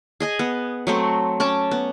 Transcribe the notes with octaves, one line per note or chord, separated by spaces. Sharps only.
G#4 D#5 G#5
B3
F#3 A3 C4
C#4 A5 D6
B3